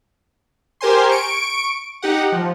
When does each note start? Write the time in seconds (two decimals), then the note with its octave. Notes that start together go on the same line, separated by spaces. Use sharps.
0.81 G4 A#4 C5 G#5 C6
1.09 C#6 D7
2.02 D#4 G4 F#5
2.32 F3